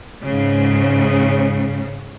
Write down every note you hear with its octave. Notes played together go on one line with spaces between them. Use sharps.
G#2 C#3